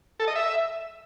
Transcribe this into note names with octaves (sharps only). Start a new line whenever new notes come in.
A4
D#5
E5